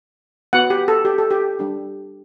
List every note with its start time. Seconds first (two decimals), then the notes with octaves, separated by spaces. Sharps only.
0.53 B3 F#4 F#5
0.70 G4
0.88 A4
1.05 G4
1.18 A4
1.31 G4
1.59 G3 D4 G4